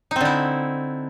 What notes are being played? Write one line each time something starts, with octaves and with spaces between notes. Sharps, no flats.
D3 C4 D#4 E4